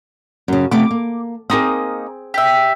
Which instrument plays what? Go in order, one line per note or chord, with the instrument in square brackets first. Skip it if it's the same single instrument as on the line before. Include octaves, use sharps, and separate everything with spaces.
[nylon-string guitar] F#2 C#3
[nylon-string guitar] C3 A3 B3 [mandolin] D6
[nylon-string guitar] A#3
[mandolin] A#3 D#4 D#6 [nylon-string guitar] C4 G#4
[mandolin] G4 E5